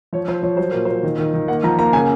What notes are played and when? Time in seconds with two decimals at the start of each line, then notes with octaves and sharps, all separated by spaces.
0.13 F3 C#5
0.28 F3 C5
0.43 F3 C#5
0.57 F#3 C5
0.71 A#2 A#4
0.85 A#2 C5
1.03 D#3
1.18 D#3
1.34 D#3
1.48 A#3 F#5
1.64 F3 A#5
1.79 A#3 A#5
1.93 C#3 G#5